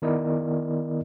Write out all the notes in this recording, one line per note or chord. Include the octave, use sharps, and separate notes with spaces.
D#3 B3 E4 A#4 D5 D#5